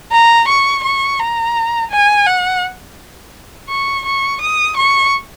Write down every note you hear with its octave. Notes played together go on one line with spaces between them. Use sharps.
A#5
C#6
C#6
A#5
G#5
F#5
C#6
C#6
D#6
C#6